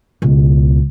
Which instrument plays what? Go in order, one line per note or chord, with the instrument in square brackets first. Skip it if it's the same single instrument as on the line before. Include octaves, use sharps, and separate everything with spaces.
[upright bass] C#2 B2